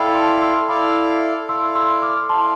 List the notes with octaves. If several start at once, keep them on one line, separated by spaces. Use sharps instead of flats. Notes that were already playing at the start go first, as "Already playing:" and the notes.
Already playing: E4 A4 D5 F5 G5 B5
A5 C6
C6 E6
E4 A4 D5 F5 B5 D6
E4 A4 D5 F5 C6 E6
C6 E6
D6 F6
E4 A4 D5 F5 A5 C6